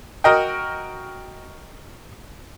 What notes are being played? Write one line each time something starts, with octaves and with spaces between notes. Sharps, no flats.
F#4 A#4 D#5 G5